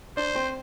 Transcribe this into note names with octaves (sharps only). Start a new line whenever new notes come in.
D4 C5
C4